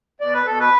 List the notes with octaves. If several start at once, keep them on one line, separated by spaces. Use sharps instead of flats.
B2 D5
B4
B2 A4
B4